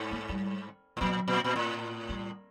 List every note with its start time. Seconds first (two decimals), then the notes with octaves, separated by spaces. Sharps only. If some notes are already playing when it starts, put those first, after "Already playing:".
Already playing: G#2
0.11 A#3
0.29 G3
0.97 A2
1.01 A#2 F#3
1.28 A#2
1.44 A#2
1.56 A2
2.09 G3